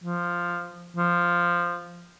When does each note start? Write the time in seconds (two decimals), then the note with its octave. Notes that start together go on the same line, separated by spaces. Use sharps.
0.04 F3
0.97 F3